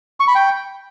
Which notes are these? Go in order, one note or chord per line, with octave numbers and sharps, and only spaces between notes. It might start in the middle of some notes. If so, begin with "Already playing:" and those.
C#6
B5
G5